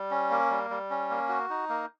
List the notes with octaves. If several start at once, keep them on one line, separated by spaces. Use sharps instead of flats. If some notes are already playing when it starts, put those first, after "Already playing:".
Already playing: G3
C#4
A#3
G3
G3
C#4
A#3
F#4
D#4
A#3